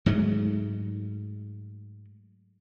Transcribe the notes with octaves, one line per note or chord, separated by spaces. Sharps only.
G#2 F#3 G#3 A3